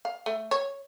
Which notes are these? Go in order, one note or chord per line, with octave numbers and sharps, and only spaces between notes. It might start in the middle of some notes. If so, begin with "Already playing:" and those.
F5
A3
C#5